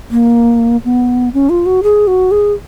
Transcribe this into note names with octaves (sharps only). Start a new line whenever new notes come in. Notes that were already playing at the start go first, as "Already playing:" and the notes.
A#3
B3
C#4
F4
F#4
G#4
F#4
G#4